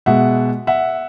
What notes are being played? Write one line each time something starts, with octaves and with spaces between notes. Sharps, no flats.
B2 G#3 E5 F#5
E5 F#5